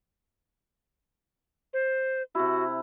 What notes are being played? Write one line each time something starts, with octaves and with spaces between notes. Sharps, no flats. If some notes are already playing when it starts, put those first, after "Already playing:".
C5
C3 E4 F#4